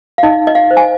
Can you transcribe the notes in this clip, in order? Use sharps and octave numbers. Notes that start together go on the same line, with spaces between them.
F5
D#4 D#5
D#5
F5
C5
G#5